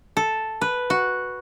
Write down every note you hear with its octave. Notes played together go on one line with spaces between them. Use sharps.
A4
B4
F#4